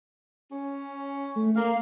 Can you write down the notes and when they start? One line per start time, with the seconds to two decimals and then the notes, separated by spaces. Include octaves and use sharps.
0.51 C#4
1.36 A3
1.56 A#3 F5